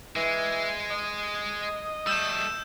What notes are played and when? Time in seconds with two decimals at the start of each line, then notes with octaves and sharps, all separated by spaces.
0.16 E3 G#3
0.90 D#5
2.07 G3 A3 E6 G6 E7